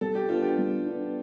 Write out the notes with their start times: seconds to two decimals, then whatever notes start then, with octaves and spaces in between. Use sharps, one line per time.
0.01 G3 A4
0.15 G4
0.29 B3 D4 F4
0.42 G4
0.58 G3
0.86 B3 D4